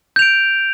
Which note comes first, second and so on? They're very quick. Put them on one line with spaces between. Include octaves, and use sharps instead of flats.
G6 F7 D7